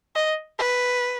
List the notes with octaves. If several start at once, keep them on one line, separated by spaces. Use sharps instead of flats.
D#5
B4